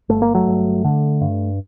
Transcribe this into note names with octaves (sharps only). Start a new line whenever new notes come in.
G1 A3
A#3
F#3 A3
G1
D3
G2